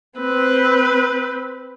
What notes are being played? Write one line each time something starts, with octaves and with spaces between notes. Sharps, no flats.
C4 B4